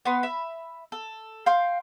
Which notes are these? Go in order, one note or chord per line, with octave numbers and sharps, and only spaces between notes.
B3 B4 C6
E5 B5
A4
F5 G5 C6